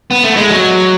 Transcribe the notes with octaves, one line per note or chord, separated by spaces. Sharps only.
B3
A3
G#3
F#3